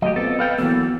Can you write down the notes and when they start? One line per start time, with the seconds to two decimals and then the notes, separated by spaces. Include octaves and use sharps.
0.02 F#3 A3 G4 D#5
0.16 B3 C4 F4 A4
0.39 A4 B4 F5 G5
0.58 E3 F#3 A#3 B3 A4